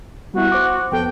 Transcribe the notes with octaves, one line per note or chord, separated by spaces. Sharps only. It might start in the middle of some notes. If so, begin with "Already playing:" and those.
G3 B3 E4 F#4
C5 D6
F2 B3 A4 G5